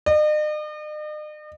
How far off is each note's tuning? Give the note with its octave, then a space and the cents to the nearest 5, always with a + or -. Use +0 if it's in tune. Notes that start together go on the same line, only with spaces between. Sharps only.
D#5 -45